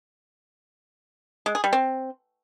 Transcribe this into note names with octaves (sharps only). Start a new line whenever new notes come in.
G#3
G#4
G3
C4